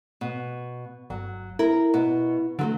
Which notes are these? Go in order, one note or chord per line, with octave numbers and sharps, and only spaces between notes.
B2
G1 F#3
E4 A#4
B2
D3 F#3 G#3 A3